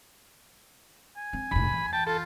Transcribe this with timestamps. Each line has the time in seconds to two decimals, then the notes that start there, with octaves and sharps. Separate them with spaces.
1.17 G#5
1.33 C4
1.51 F1 A2 B5
1.71 E3
1.93 G5 A5
2.07 F4 A4